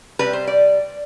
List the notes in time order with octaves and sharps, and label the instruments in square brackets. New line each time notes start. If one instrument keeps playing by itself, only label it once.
[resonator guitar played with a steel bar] C3 G3 B4
C5
D5